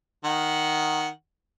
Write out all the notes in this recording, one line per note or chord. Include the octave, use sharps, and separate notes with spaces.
D#3 F#5